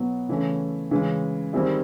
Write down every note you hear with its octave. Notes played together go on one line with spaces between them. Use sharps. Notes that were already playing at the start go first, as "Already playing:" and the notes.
Already playing: B2 F#3 B3 E4
C#3 E3 A3 C#4
C#3 E3 G#3 C#4
D#3 G3 C4 E4 G#4